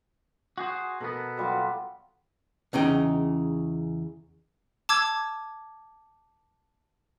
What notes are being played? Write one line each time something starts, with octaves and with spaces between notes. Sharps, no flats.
F#4 G#4 C5
B2 B3 A4 A#4
F#3 G3 F4
E2 C#3 D#4 G5
A5 D6 E6 G#6